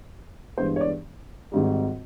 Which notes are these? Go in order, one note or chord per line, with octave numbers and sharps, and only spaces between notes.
G2 E3 G#3 B3 C5
C#5
D5
G#1 G#2 D#3 G3